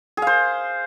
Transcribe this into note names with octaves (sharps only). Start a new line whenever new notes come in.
G#4 C5 F5